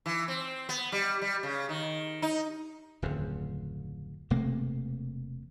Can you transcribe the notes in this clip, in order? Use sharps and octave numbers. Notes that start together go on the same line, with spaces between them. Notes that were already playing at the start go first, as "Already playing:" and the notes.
E3
C4
B3
G3
G3
C#3
D#3
D#4
D1 F2 C#3
E1 C3 A3 A#3